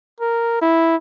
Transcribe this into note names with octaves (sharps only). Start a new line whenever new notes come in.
A#4
E4